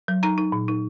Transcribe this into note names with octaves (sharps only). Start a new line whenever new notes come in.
F#3
D#4 A#5
D#4
A#2
D#4